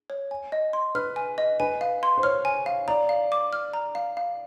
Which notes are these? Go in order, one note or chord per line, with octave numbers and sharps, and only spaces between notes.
C#5
G#5
D#5
C6
B4 F6
G#5
D#5
B4 G#5
F5
C6
C5
C#5 F6
G#5
F5
D5 A#5
F5
D6
F6
A#5
F5
F5